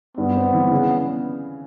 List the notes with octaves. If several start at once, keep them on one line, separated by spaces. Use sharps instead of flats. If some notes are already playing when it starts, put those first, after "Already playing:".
G2 B3
C4
E3
C#3